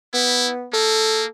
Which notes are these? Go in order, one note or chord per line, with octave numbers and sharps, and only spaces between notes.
B3 E4
A#3 A4